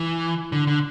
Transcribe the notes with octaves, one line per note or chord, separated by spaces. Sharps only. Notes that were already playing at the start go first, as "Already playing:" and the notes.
Already playing: E3
D3
D3